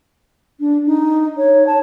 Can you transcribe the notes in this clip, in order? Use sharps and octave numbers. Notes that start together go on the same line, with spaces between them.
D4
D#4
C#5
A5